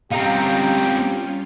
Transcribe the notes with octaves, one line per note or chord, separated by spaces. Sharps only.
G3 C4 C#4 D#4 F4 G4 F5 A#5